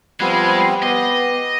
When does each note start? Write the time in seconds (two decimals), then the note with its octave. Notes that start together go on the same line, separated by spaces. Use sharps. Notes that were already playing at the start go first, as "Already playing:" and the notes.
0.20 F3 G3 G#3 B3 C4
0.83 B3 G4 D#5